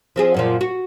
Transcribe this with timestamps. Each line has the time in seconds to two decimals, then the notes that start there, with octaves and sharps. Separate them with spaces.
0.16 F3 C4 G#4
0.34 F#2 A#2 F3
0.61 F#4